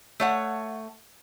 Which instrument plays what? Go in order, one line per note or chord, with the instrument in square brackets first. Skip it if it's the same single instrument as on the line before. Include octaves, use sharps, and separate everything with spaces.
[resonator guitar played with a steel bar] A3 C#5 F#5